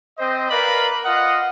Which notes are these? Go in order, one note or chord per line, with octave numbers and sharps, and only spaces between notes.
C4 C5 D#5
A#4 B4 D5 F5 B5
F4 D#5 F5 F#5